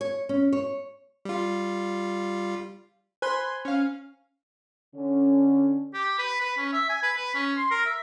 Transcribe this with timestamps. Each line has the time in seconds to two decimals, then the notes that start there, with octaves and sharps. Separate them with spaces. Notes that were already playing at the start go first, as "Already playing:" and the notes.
0.01 C#5
0.29 C#4
0.53 C#5
1.25 G3 F4
3.22 C5 G#5 B5 C6
3.65 C#4 F5
4.94 D3 C#4
5.94 G4
6.18 B4
6.40 B4
6.57 C#4
6.73 E5
6.89 G#5
7.03 B4
7.16 B4
7.34 C#4
7.57 C6
7.71 A#4
7.86 E5